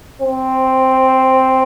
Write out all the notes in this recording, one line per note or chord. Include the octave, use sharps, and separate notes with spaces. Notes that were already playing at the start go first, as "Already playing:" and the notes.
C4